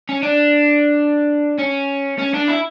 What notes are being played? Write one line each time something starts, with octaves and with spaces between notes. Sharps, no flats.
C#4
D4
C#4
C#4
D4
E4